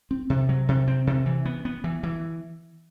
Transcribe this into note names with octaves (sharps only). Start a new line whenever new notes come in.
C4
C3
F#3
C3
C4
C3
E3
B3
B3
E3
E3